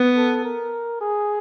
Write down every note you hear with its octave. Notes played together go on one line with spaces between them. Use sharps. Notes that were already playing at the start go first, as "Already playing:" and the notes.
Already playing: B3
A4
A#4
G#4